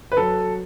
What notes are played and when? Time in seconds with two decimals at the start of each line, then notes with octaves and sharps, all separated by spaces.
0.12 B4
0.17 F#3 A4